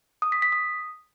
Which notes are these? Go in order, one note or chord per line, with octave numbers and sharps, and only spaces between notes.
D#6
B6
B6
D#6